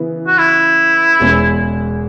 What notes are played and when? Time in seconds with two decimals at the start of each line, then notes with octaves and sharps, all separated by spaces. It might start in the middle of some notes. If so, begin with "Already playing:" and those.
Already playing: C#3 E3 B3 E4
0.27 F#4
0.38 E4
1.20 E1 E2 B2 G#3 C#4